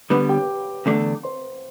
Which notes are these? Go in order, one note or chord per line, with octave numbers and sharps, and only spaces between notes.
D3 G3 B3 B4 B5
G4 G5
E2 D3 A3 D4
C5 C6